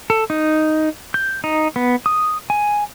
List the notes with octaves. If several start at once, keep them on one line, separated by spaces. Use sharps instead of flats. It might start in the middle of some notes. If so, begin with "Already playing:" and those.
A4
D#4
G6
D#4
B3
D#6
G#5